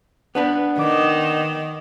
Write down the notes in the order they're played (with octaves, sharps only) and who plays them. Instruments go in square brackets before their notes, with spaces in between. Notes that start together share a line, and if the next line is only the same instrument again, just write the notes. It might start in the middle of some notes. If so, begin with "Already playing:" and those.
[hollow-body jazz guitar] B3 D4 B4
[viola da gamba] D#3 [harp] D6